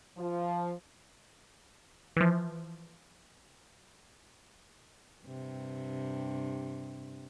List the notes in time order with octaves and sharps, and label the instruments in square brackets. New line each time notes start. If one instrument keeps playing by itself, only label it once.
[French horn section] F3
[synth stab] E3 F3
[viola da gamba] G2 C3